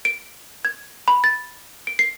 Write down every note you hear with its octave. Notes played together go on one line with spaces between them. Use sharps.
D7
G#6
B5
A6
D7
C7